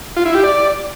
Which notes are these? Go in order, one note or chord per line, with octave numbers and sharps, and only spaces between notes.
F4
E4
G4
D5